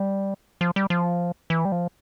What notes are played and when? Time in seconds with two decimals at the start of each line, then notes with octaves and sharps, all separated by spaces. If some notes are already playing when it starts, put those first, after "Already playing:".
Already playing: G3
0.61 F3
0.76 G3
0.90 F3
1.50 E3
1.65 G3
1.72 F3